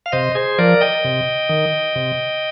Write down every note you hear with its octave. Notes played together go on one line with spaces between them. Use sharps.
F5
C3 C5 D#5
G#4 C5
F3 A#4 D5
D#5 G5
C3
D#3
C3